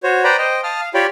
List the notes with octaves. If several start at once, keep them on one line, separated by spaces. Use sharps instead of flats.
F#4 C5 C#5
B4 C5 D5 G5 A#5 B5
C5 D#5 G5
F5 A5 D#6 F6
F5
F4 G4 C#5 D5 G5 B5